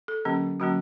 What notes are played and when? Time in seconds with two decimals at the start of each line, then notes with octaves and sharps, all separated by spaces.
0.08 A4
0.25 D3 F#3 A#3 C#4 G4
0.60 D3 F#3 A#3 C#4 F#4